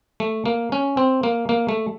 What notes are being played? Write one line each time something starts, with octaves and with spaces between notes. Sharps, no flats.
A3
A#3
C#4
C4
A#3
A#3
A3